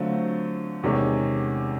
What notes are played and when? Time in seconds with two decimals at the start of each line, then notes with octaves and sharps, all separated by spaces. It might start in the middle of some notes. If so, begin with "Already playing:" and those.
Already playing: D3 F#3 A3 C4 F4
0.83 E2 C3 D#3 G#3 C#4